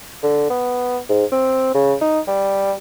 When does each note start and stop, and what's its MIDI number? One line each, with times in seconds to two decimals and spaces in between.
0.23 0.47 50
0.50 0.99 59
1.09 1.25 44
1.32 1.74 60
1.75 1.95 49
2.01 2.20 63
2.28 2.73 55